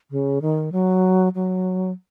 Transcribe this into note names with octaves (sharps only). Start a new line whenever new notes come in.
C#3
D#3
F#3
F#3